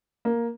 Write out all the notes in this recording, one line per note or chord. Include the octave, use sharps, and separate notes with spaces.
A#3